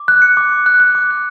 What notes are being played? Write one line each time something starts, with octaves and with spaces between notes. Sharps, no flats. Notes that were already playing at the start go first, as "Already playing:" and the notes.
Already playing: D6
F#6
C#7
D6
D6
F#6
F#6
D6
F#6